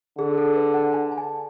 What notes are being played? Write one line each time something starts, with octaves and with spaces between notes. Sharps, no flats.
D3 G#4
A4
B4
F#5
G#5
A5
G#5